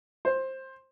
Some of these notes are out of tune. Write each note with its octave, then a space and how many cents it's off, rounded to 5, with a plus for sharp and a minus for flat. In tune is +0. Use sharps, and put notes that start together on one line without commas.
C5 +15